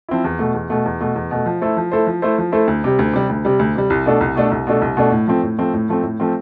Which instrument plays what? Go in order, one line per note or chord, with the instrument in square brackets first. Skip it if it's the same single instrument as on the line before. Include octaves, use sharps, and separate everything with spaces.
[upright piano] F3 C4 E4
E2
B2 A3
E2
B2 A3
E2
B2 A3
E2
B2 A3
F3
A3 E4 A4 C5
F3
A3 E4 A4 C5
F3
A3 E4 A4 C5
F3
A3 E4 A4 C5
D2
C3 G3
D2
C3 G3
D2
C3 G3
D2
C3 G3
C2
B2 A3 D4 A4
C2
B2 A3 D4 A4
C2
B2 A3 D4 A4
C2
B2 A3 D4 A4
A2
F3 A3 C4
A2
F3 A3 C4
A2
F3 A3 C4
A2
F3 A3 C4